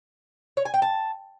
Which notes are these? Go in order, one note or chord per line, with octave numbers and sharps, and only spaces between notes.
C#5
G#5
G5
A5